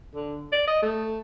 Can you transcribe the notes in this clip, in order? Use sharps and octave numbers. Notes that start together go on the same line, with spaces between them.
D3
D5
D#5
A3